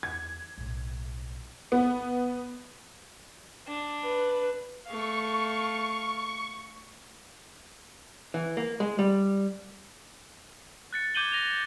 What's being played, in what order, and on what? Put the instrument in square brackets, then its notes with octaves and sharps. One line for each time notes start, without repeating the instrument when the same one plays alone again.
[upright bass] E2 [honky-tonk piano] G#6
[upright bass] B1 A2
[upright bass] G1 [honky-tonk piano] B3
[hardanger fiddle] D4
[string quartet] B4
[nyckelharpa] A3 F5 [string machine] C#6
[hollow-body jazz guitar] E3
A#3
G#3
G3
[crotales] F#6 A6 C#7
D6 G6 G#6 D#7 F#7 G7
A#6 D#7 F7 G7